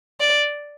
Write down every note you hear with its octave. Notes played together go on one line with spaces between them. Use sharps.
D5